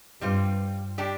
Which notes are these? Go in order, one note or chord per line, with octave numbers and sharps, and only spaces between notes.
G2 G3 C4 F4
G3 D4 G4